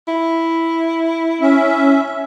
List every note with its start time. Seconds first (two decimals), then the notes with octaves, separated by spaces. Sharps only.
0.08 E4
1.41 C#4 E5